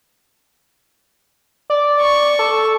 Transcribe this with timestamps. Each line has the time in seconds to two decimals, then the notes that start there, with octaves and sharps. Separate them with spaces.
1.70 D5
2.02 C#6
2.39 A4